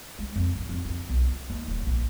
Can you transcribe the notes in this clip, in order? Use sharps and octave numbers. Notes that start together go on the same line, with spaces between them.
G#3
F2
G#2
F2
F2
B1
F4
D#2
D#1
A#1